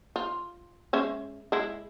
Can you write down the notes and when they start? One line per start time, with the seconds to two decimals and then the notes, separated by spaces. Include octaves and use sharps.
0.16 F4
0.93 G#3 C#4 E5
1.52 G#3 E4